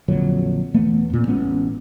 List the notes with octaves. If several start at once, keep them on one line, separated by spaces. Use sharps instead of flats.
A#1 F2 D3 F#3
E1 E3 A3 B3
F2 A#2
A1 G#3 B3 C#4